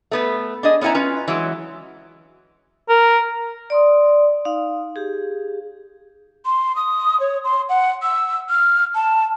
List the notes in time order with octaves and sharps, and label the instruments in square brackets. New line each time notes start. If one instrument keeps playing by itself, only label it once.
[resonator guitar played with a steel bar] A3 B3 B4
D4 G#4 D#5
B3 C#4 D4 E4 G#5 A#5
C#4 F4 B4
E3 F#3 G#3
[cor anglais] A#4
[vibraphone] D5 C6 D#6
D#4 F5
G4 G#4
[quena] C6
D#6
C#5
C6
F#5
E6
F6
A5